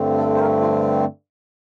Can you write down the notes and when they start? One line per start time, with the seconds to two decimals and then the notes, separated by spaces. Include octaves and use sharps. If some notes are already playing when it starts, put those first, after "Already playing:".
Already playing: G2 D3 A3 C4
0.18 A4
0.35 C5
0.40 A#4
0.61 F4